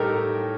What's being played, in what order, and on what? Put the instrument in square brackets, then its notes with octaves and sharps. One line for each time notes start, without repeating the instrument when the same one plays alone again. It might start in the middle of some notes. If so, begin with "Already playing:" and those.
Already playing: [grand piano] A2 G3 D#4 G4 A4 A#4